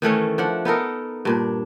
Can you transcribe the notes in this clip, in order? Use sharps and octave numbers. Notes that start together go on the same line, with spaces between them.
D#3 E3 A3 C#4
F3 D4 F#5
B3 D#4 A4 A#4
G2 A#2 D4